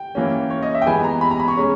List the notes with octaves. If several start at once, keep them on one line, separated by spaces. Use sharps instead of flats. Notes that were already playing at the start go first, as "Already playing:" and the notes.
Already playing: G5
E3 A#3 C#4
C#5
D#5
E5
G5
E3 G#3 B3 G#5
A#5
B5
A#5
B5
C#6
G#3 C#4